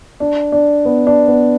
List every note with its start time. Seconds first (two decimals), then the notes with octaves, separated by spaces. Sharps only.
0.20 D4
0.52 D4
0.85 B3
1.07 D4
1.28 B3